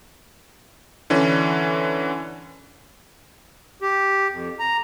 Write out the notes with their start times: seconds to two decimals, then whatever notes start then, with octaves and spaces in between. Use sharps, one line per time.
1.10 D3 E3 C#4
3.82 G4
4.31 F2
4.59 A#5